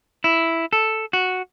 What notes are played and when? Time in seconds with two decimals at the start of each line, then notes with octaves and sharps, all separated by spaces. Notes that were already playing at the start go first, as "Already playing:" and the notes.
0.24 E4
0.73 A4
1.13 F#4